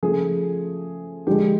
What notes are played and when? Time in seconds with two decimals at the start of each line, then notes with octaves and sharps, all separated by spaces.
0.03 C#3 F3 A3 G#4
1.27 D3 F3 G#3 G4